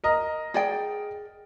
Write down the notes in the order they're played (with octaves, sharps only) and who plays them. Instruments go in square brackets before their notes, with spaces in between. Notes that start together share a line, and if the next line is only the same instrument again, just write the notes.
[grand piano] A#4 D#5
[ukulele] G#4 D5 G5